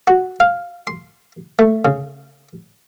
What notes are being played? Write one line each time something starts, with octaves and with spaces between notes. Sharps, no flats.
F#4
F5
C6
A3
C#3